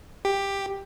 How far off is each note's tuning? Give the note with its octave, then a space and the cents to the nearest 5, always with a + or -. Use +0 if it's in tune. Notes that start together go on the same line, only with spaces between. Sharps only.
G4 +10